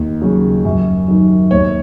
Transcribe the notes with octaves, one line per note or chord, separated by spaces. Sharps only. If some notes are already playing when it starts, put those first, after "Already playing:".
Already playing: D#2
C#3 F#3
F#2
D#3 F#3
D#2 C#5